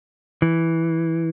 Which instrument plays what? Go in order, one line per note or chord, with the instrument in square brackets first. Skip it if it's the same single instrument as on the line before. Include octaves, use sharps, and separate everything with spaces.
[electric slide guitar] E3